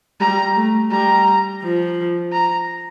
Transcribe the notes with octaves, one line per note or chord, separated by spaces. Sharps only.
G3 A#5
A3
G3 A#5
F3
A#5